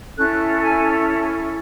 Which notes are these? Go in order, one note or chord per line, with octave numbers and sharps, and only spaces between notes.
C#4 E4 A4 F#6
G#5